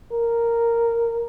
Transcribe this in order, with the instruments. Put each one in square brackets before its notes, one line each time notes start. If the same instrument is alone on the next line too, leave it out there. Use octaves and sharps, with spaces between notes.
[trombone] A#4